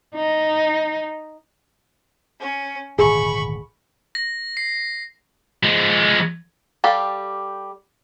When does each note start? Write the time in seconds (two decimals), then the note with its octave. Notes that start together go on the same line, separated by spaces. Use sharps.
0.15 D#4
2.39 C#4
2.99 D#1 G#1 D2 G#4 B5 C#6
4.15 A#6
4.57 C7
5.63 F3 G#3
6.84 G3 G4 A4 F5